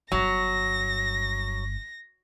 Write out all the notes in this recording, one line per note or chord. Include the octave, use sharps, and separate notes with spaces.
G1 G2 F#3 A#6